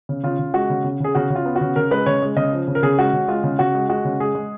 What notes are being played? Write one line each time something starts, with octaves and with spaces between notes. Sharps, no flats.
C#3
C#3 F4
C#3
G#3 F#4
C#3
C#3
C#3 G#4
C#3 F#4
C#3
F4
B3
F#4
C#3
C#3 A#4
G#3 B4
C#3 C#5
G#3
C#3 D#5
F3
C#3
A#4
C#3 G#4
G#3 F#4
C#3
G#3 F4
C#3
C#3 F#4
G#3
G#3 F#4
C#3
G#3 G#4
G#3